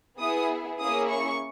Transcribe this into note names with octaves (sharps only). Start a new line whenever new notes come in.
B3 E4 G#4 D#6
A#3 C#4 E4 G#4 D#6
C#6